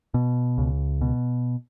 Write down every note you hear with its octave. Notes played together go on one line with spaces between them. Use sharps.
B2
C#2
B2